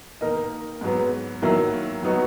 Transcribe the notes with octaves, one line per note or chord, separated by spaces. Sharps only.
D#3 A#3 D#4 A#4 D#5
G#2 F#3 B3
D#3 F#3 A#3 E4
F#3 B3 D#4 F#4